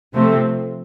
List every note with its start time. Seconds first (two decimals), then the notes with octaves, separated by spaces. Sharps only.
0.14 C3 F3 A3 C4